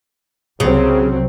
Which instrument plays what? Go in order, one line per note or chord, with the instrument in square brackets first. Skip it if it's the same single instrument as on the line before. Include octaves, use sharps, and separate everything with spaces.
[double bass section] C2 F#3 C4 [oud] C#3